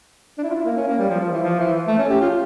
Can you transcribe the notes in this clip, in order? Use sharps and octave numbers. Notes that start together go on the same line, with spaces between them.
D4
E4
F4
E4
A#3
C#4
A#3
G3
F3
F3
E3
F3
E3
A3
C#4
G4
F4